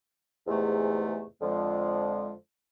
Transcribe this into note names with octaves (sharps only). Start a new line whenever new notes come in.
E2 G#2 C3 A3
F2 D3 F3 G#3